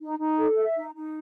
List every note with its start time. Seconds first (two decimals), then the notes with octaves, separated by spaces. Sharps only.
0.01 D#4
0.19 D#4
0.38 A4
0.57 E5
0.76 D#4
0.95 D#4